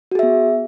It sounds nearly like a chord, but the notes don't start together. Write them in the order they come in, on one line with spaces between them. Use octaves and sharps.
F#4 G#4 E5 B3